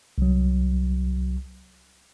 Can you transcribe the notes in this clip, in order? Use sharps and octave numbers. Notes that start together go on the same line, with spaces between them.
C2 F#3